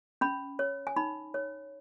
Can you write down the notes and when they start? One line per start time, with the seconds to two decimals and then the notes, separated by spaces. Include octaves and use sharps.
0.21 C#4 B5
0.59 C#5
0.87 G#5
0.96 D#4 B5
1.34 C#5